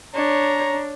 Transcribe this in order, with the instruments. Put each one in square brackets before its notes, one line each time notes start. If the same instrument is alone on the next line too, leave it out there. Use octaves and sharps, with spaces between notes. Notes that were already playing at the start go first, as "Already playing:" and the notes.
[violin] D4 [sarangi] C#5 [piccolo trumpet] A#5